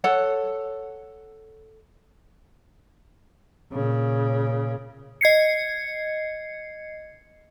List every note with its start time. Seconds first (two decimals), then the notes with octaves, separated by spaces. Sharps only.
0.04 A4 C#5 F#5
3.72 A#2 C#3
5.21 D#5 G#6 C7 C#7